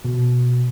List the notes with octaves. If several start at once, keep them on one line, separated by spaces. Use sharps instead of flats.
B2